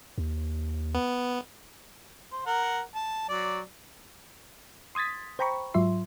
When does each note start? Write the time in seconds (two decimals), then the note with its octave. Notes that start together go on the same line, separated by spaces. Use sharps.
0.18 D#2
0.94 B3
2.32 C5
2.46 A#4 F#5
2.95 A5
3.29 F#3 D5
4.95 C6 D#6 G#6 A6 B6
5.39 C5 G5 A#5 B5 C#6
5.74 G#2 F#3 F4 E5 C6